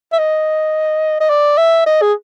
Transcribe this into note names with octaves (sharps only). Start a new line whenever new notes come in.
E5
D#5
D#5
D5
E5
D#5
G#4